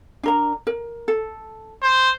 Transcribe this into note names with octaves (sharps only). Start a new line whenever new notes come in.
D4 A#4 A#5
A#4
A4
C5